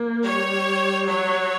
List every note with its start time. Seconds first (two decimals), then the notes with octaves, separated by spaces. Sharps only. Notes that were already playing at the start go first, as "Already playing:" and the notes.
Already playing: A#3
0.24 G3 C#5
1.07 F#3 C#5